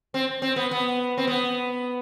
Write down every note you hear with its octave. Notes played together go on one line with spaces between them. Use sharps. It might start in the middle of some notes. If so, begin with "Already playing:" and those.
C4
C4
B3
B3
C4
B3